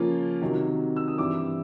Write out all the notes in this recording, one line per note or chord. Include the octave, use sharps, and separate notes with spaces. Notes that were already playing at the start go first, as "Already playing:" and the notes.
Already playing: C#3 F3 A#3 C#4 F4
C3 D#3 F#3
E6
D#6
G2 E3 G3 C4 E4 D6